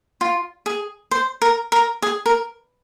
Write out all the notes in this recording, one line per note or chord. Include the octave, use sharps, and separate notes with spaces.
F4
G#4
C5
A#4
A#4
G#4
A#4